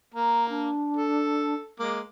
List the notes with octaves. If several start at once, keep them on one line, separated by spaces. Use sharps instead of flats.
A#3 A#5
D4
A4
G#3 A#3 D6